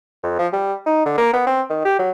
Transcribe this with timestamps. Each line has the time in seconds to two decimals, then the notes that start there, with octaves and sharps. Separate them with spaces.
0.23 F2
0.39 F3
0.53 G3
0.86 D#4
1.05 D3
1.18 A#3
1.33 B3
1.47 C4
1.70 D#3
1.85 G4
1.99 F#3